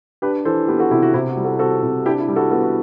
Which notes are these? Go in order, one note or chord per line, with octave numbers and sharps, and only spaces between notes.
D4 G4 B4
E3 A4 C5
B3 G4 B4
F#4 A4
C3 E4 G4
F#4
C3 E4
F#4
G3
F#4 A4
C4 F#4 A4
C3
D4 E4 G4
E4
G3
F#4 A4
B3 F#4 A4
F#4